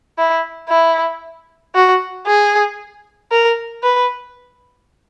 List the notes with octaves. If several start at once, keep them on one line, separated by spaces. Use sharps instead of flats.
E4
E4
F#4
G#4
A#4
B4